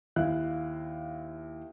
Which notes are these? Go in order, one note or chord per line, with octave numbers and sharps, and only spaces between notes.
D#2 E4 F5 F#6